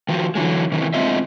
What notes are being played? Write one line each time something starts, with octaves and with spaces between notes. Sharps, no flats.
D#3 F3 F#4
D3 E3 F#3 G#3
C3 D#3 E3
G#3 C4 F4 D#5 E5